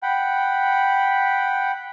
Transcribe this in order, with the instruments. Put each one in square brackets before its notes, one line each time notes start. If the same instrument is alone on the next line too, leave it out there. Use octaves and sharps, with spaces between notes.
[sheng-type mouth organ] F#5 G5 B5